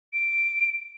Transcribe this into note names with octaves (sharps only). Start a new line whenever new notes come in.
D7